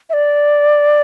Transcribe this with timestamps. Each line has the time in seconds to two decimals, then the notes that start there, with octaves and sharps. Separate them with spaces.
0.10 E5
0.13 D5